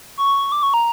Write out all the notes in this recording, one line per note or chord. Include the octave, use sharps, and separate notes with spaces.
C#6
D6
C#6
A#5